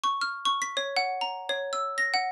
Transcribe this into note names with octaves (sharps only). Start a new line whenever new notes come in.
C#6
F6
C#6
B6
C#5
F#5
A#5
C#5
E6
A#6
F#5